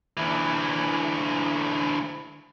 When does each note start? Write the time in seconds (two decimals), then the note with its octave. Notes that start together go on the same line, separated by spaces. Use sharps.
0.17 D2 E3